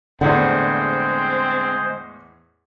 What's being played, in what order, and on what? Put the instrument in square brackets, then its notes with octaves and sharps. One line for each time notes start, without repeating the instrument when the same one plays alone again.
[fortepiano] E2 A2 F#5 [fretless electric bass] D3 [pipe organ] G#3 C5 [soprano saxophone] C4